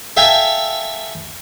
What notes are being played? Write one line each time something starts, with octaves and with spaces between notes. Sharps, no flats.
A4 E5 F5 G5 G#5